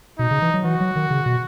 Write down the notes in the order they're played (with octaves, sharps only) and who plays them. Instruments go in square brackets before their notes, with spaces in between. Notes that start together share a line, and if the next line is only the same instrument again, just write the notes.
[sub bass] B2 [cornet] D#4
[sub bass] C#3
E3
F#3
[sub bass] E3 [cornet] F#4
[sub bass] F#3
D#3
C#3
B2